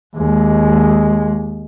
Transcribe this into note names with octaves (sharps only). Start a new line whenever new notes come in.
D#2 G#3